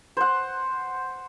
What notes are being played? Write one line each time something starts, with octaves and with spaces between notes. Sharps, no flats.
C5 F#5